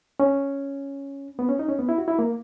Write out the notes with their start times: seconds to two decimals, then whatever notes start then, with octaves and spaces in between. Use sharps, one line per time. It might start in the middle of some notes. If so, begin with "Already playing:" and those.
0.20 C#4
1.39 B3
1.49 C#4
1.59 D#4
1.69 C#4
1.79 B3
1.89 E4
1.98 F#4
2.08 E4
2.19 A#3